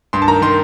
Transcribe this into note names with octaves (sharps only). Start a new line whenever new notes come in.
G2 C6
A5
D#3 A#5
D#3 C6